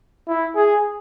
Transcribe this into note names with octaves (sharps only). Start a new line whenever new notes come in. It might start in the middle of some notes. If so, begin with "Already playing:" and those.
E4
G#4